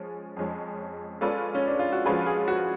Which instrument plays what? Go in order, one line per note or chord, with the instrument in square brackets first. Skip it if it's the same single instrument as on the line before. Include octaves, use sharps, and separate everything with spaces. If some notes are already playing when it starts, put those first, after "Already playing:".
Already playing: [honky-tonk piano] F3 G#3 C#4 G#4
F2 F3 G#3 C#4
[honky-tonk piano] G#3 C#4 F4 B4 D5 [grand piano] A4
[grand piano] C#4
D4
F4
F#4
[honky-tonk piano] F3 G#3 C#4 F4 B4 [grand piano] G#4
[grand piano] G#4
F#4